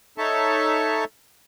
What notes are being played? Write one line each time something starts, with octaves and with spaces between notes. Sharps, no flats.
D#4 A4 C#5 E5 A5